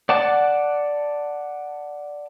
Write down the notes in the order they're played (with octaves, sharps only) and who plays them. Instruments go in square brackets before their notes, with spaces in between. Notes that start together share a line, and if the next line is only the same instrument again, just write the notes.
[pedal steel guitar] D5 F#5 A5 D6